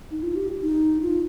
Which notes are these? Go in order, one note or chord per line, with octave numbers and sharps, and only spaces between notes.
D#4
F4
G4
D#4
F4